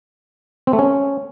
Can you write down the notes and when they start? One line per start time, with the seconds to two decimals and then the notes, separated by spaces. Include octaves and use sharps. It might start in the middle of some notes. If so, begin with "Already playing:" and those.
0.67 C4
0.73 A3
0.79 C#4